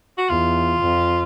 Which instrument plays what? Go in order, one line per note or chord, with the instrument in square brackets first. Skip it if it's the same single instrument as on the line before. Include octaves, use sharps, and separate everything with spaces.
[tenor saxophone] F#4
[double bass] E2 [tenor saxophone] F4
[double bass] F2